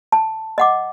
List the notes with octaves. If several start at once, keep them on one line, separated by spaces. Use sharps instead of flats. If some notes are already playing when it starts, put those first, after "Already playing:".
A5
D#5 F#5 D6